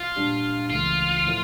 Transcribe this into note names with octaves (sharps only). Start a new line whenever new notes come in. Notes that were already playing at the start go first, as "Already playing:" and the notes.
Already playing: F4
A#2 G3 D4 G4
C#2 C#3 E3 A3 F4
A2 F3 A3